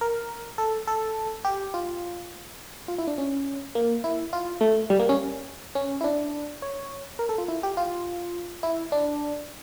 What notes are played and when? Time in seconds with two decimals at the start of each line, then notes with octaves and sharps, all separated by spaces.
0.01 A#4
0.58 A4
0.88 A4
1.45 G4
1.74 F4
2.88 F4
2.98 E4
3.07 D4
3.18 C#4
3.75 A#3
4.04 E4
4.33 F4
4.61 A3
4.90 G3
4.99 A#3
5.09 C#4
5.75 C#4
6.01 E4
6.04 D4
6.62 C#5
7.19 A#4
7.29 A4
7.38 F4
7.48 E4
7.63 G4
7.77 F4
8.63 E4
8.92 D4